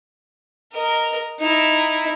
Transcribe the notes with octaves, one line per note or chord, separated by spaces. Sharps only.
A#4 D#5
D#4 E4